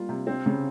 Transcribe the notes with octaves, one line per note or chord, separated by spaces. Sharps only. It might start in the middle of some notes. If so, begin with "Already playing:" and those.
Already playing: G3 A#3 F4
C3
C4
C#3